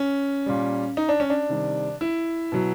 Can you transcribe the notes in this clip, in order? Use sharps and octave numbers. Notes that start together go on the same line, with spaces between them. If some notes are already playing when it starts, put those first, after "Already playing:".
Already playing: C#4
A#2 G3
D#4
D4
C#4
D4
C3 D#3 G3
E4
B2 F#3